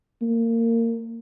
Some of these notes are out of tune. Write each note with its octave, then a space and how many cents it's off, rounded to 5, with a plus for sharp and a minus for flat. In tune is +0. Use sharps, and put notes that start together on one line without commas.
A#3 -25